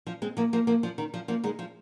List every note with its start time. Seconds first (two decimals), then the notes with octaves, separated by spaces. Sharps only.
0.07 F3
0.22 G#3 C4
0.37 F3 A#3
0.53 F3 A#3
0.67 F3 A#3
0.83 F3
0.98 D#3
1.14 F3
1.28 F3 A#3
1.44 D#3 G#3
1.59 F3